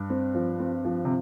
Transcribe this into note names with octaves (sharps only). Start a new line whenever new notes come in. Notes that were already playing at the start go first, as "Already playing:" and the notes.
Already playing: G2
C4
F3
C4
F3
C3